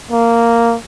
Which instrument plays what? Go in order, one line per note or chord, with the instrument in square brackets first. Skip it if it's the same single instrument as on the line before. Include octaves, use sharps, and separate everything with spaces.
[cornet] A#3